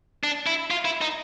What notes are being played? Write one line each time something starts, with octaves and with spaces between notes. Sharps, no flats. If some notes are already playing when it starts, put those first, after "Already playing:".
D4
E4
F4
E4
D#4